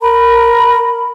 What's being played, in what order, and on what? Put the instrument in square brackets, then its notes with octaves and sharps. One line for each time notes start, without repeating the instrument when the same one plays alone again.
[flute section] A#4 A#5 B5